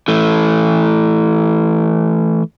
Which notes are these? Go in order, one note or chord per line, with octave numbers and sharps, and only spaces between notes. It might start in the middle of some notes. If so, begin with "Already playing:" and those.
E3 A3